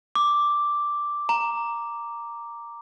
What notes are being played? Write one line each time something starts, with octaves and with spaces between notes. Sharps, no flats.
D6
A#5